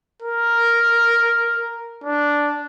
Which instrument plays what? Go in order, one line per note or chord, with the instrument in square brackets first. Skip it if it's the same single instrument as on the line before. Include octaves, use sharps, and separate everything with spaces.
[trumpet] A#4
D4